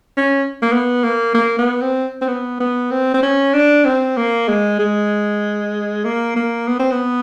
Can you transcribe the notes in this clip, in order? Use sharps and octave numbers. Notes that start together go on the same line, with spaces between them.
C#4
A#3
B3
A#3
A#3
B3
C4
C4
B3
B3
C4
C4
C#4
D4
C4
A#3
G#3
G#3
A#3
A#3
B3
C4
B3